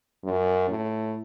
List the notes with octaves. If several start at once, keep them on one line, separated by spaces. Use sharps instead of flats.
F#2
A2